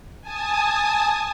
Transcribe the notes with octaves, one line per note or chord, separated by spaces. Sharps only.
G#5 A5 D#6